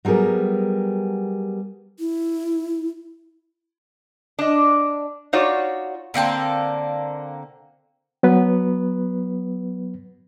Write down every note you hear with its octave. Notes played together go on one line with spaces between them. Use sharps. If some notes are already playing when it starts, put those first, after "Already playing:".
F#3 G3 B3 G#4 A#4
E4
D4 D#5
D#4 F4 F#4 C#5 D5
D3 A#3 C4 A5
F#3 B3 B4